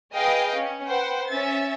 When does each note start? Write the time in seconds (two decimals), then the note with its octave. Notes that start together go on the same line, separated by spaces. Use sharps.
0.13 G#4 B4 D#5 F5 G5
0.56 C#4
0.88 B4 C5 F#5 G5
1.28 C#4 E5 A6